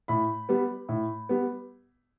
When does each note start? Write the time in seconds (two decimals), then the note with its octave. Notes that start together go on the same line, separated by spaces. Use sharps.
0.08 A2 B5
0.49 G3 B3
0.89 A2
1.29 G3 B3